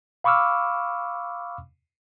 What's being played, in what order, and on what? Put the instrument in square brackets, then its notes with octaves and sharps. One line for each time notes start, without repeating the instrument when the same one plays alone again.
[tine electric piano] F5 B5 C#6 D6 E6 F6